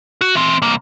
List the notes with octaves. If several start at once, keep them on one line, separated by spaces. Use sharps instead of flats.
F#4
E3 C4
C2 A#3